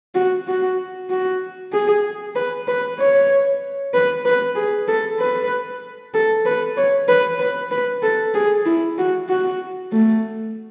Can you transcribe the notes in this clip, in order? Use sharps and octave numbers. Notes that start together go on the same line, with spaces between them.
F#4
F#4
F#4
G#4
B4
B4
C#5
B4
B4
G#4
A4
B4
A4
B4
C#5
B4
B4
B4
A4
G#4
E4
F#4
F#4
A3